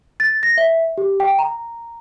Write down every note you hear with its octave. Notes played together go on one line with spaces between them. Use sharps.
A6
A#6
E5
G4
G5
A#5